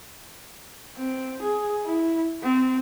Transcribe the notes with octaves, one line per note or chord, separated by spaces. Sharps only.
C4
G#4
E4
C4